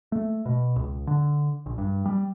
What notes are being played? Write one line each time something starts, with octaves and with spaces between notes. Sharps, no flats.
A3
B2
C#2
D3
A#1
G2
G3